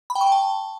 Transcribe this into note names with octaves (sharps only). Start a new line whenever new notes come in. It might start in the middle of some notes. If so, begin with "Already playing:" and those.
B5
G5
C#6
G5
A5